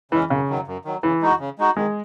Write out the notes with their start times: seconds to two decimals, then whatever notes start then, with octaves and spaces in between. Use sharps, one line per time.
0.11 C#3 E3 G#3 C#4
0.30 F#2 C#3
0.49 D#3 F#3
0.67 F#2
0.85 D#3 F#3
1.03 C#3 E3
1.21 G#3 D#4 F#4
1.40 C#3
1.59 G#3 D#4 F#4
1.77 D#3 G#3